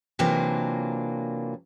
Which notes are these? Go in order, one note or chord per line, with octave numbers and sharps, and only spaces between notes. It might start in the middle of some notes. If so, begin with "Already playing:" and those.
C3 E3 F#3 A#3 D4 F4